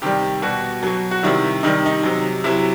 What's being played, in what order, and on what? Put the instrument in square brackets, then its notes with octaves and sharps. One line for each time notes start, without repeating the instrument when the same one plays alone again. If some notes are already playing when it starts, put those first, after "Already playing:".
[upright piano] C3 D#3 G3 G4
B2 G3 F#4
B2 F#3
F#4
C3 D#3 G3 E4
C3 D#3 G3 D#4
D#4
C3 F#3
C3 F#3 E4